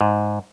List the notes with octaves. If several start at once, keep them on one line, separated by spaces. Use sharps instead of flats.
G#2